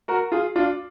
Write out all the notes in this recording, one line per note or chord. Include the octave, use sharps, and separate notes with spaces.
F#4 A#4
F4 G#4
D4 F4